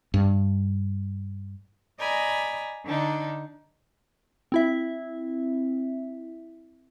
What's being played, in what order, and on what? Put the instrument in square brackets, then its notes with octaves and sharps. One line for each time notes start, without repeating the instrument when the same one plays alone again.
[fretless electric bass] G2
[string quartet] D5 D#5 G#5 A#5 B5
D3 D4 D#4
[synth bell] C4 E4 E5